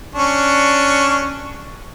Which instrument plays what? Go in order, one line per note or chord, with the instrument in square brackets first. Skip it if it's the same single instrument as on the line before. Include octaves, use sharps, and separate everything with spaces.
[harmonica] C#4 D4 C#6